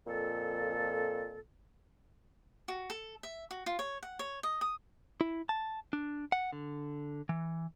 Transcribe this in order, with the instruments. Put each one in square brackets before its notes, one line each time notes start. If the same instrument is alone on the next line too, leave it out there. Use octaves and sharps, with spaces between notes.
[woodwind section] F2 A#2 A4
[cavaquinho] F#4
A4
E5
F#4
F4
C#5
F#5
C#5
D#5
D#6
[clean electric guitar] E4
A5
D4
F#5
D3
E3